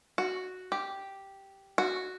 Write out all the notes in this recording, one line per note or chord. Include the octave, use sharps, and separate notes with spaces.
F#4
G4
F#4